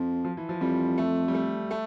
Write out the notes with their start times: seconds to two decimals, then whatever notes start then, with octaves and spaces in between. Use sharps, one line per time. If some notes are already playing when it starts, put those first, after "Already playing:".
Already playing: F2 F3
0.25 F3
0.37 E3
0.49 F3
0.61 F2 G3
0.98 A3
1.28 G3
1.35 A3
1.71 A3